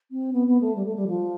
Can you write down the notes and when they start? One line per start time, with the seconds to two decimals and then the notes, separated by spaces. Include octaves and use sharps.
0.11 C4
0.33 B3
0.47 B3
0.61 A3
0.76 G3
0.86 A3
0.96 G3
1.07 F3